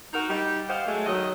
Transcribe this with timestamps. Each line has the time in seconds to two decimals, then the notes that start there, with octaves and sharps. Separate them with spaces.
0.14 D#4 F#4 A#4
0.29 G3 D#4 G4
0.69 F4 G4 C5 D#5 F5 F#5
0.86 F#3 G#3 A3
1.06 D#3 F#3 D#5